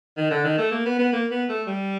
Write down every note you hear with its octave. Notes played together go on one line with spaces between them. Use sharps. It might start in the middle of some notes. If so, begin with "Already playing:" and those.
D#3
D3
D#3
A3
A#3
B3
B3
A#3
B3
A3
G3